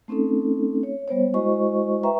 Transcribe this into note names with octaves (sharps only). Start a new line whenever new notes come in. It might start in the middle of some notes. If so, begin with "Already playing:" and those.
A3 C4 C#4 D#4 A4
C#5
G3 B3 C5 C#5
G#3 E4 F#4 C5 D#5 C#6
B4 E5 G5 A#5 C#6